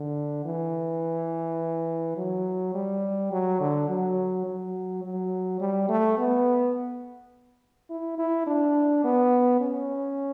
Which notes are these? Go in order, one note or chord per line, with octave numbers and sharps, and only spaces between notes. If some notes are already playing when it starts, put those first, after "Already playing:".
Already playing: D3
E3
F#3
G3
F#3
D3
F#3
F#3
F#3
G3
A3
B3
E4
E4
D4
B3
C#4